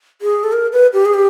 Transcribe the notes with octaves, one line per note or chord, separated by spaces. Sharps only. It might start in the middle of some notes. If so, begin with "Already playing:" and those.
G#4
A4
A#4
B4
G4
G#4
G4